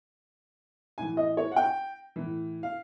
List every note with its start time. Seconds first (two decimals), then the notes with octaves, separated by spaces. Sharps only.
0.98 A2 E3 G#5
1.17 D#5
1.37 C#5
1.52 F#5
1.56 G5
2.16 A2 E3
2.63 F5